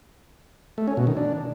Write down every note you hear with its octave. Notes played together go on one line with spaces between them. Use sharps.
A3
C#4
B2
D#3
D4